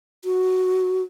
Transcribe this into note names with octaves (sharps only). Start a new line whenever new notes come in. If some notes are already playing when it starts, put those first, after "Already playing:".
F#4